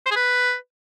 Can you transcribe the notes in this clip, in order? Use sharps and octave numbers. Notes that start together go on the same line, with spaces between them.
C5
G#4
B4